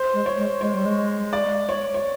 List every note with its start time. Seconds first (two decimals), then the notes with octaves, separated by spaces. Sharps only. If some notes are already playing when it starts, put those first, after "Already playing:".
Already playing: C5
0.14 G#3
0.26 C#5
0.37 G#3
0.61 G#3 C#5
0.74 G3
0.85 G#3
1.33 D5
1.69 C#5
1.94 C#5